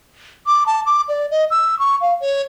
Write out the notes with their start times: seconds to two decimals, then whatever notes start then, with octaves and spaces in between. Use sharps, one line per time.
0.47 D6
0.66 A5
0.86 D6
1.08 D5
1.31 D#5
1.51 E6
1.79 C#6
2.01 F5
2.21 C#5